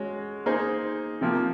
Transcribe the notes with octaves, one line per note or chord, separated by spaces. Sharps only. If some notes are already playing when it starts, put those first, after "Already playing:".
Already playing: G#3 C#4 F#4
A#3 D#4 G#4 C5
C3 F3 A#3